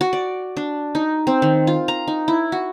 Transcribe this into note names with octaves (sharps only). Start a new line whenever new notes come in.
F#4
D5
D4
D#4
C4
D#3
F4
A#5
D#4
E4
F#4